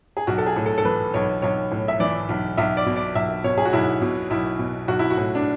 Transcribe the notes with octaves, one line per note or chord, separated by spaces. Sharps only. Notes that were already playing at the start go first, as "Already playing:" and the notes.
G#4
B1 F#4
A4
G#4
A2
A4
A4
E3 B4
B1 C#5
B1 C#5
A2
E5
E3 D5
B1
B1 E5
D5
B2
D5
B1 E5
B2 C#5
G#4
F#4
B1 E4
B2
B1 E4
B2
B1 F#4
E4
F#4
A2
D4